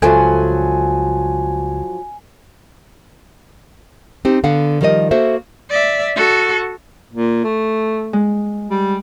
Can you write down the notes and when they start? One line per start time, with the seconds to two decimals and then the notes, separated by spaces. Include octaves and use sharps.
0.02 C#2 G2 F3 F#3 A4 E5 G#5
4.25 C4 D#4 G4 C5
4.44 D3 B3 F5 F#5
4.81 D#3 F3 G3 A#4 C5 D#5
5.11 A#3 F#4 A4 C5 E5
5.70 D5 E5
6.16 F#4 A4
7.13 A#2
7.44 A3
8.13 G#3
8.70 G3